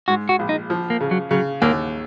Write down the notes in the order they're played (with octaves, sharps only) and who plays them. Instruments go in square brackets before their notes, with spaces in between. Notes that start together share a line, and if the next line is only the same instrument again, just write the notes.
[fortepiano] G#2 [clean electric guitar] F#4
[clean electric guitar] F#4
[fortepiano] A#1
[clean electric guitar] D#4
[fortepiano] F3
[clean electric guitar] A#3
[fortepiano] C#3
[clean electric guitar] F#3
[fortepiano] C#3 [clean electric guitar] F#3
[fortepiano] D#2 [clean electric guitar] A#3